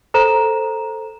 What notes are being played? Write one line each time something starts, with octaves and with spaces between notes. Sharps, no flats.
A4 C5 A#5 E7